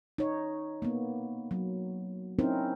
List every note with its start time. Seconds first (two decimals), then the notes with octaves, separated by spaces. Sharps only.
0.18 D#4 C#5
0.82 A#3 B3
1.51 F#3
2.39 C4 C#4 D#4 E4 A#4 C5